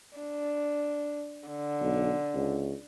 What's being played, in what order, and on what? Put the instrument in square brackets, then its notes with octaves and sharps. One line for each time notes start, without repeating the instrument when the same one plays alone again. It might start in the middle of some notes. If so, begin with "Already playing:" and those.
[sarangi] D4
D3
[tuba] B1
C#2